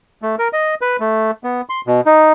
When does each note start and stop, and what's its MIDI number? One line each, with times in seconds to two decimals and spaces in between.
0.22 0.35 57
0.39 0.48 70
0.53 0.75 75
0.81 0.97 71
1.00 1.31 57
1.44 1.61 59
1.69 1.81 84
1.87 2.01 47
2.06 2.33 63